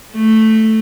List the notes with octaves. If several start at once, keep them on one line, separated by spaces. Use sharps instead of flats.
A3